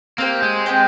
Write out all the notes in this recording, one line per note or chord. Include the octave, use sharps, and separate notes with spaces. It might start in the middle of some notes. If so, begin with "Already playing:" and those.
A#3 C4 G4 C5 G5
G#3
C4 G4 C5 G5